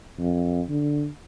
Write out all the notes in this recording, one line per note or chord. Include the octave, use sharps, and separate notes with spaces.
F2
D3